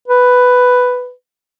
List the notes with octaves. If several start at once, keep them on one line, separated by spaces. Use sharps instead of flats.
B4